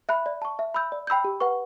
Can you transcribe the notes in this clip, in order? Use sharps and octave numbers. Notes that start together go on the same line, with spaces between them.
E5 B5 F#6
D5
A5 C#6
E5
B5 E6 G6
D5
G5 B5 E6 G6
G4
B4 F#5 C#6